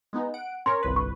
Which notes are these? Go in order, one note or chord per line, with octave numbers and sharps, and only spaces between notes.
G#3 B3 D#4
F#5 D7
C#4 A#4 C#5 C6
G1 C2 B4
C#6